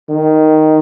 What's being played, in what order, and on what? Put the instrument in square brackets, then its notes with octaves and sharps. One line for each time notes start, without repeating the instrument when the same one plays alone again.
[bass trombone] D#3